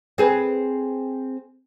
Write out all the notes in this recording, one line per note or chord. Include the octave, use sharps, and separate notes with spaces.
C4 G#4 B4